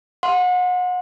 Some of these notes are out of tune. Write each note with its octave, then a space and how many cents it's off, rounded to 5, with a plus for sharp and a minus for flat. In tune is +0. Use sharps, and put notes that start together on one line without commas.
F#5 -35 C6 +0